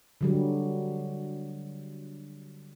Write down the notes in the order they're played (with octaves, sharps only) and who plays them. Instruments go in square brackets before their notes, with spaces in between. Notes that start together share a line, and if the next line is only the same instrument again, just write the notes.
[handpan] D3 F#3 G3